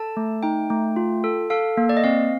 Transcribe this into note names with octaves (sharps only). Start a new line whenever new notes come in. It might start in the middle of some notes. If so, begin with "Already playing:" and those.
Already playing: A4 A5
A3
D#4 G5
A3
F4
A4
A4 F5
A#3
D5
D#5
C4 F5